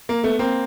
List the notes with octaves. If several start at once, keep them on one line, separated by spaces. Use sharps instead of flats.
A#3
A3 B3
A#3 C4